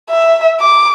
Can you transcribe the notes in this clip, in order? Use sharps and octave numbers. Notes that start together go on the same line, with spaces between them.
E5
D6